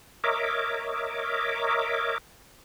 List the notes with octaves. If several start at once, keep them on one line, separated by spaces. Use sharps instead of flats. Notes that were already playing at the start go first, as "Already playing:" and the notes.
A#4 C#5 D#5 E5 D6